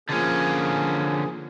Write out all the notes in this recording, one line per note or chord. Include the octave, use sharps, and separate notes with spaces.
D3 F3 A#3 C#4 G#4